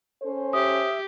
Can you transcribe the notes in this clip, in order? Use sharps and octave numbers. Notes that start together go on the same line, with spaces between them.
C#4 A4 C5
G4 E5 D#6